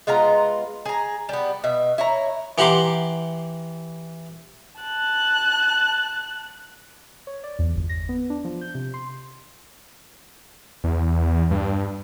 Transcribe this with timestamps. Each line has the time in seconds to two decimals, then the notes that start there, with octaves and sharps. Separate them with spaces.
0.07 G#3 B3 F4 A#5
0.86 G#4 A#5
1.29 G3 B3
1.64 B2 E5
1.98 E4 C#5 A#5
2.58 E3 G4 F#5 A#5 C6 D6
4.81 A5 F#6
7.27 C#5
7.44 D5
7.59 E2
7.76 G1
7.89 A#6
8.09 B3
8.30 D4
8.45 F3
8.61 G6
8.75 C3
8.94 C6
10.84 E2
11.51 G2